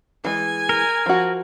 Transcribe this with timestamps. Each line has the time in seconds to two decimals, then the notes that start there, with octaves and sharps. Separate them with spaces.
0.25 E3 G#3 G#5
0.69 A#4
1.06 F3 F#4